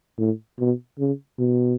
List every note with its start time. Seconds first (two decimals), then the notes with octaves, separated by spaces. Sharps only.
0.18 A2
0.59 B2
0.99 C#3
1.39 B2